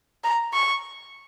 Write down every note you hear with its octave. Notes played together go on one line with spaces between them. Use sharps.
A#5
C#6